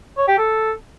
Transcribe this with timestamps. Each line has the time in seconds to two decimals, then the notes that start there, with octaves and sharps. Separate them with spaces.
0.18 C#5
0.28 G4
0.38 A4